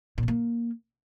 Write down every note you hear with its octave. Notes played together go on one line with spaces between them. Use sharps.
A#2
A3
A#3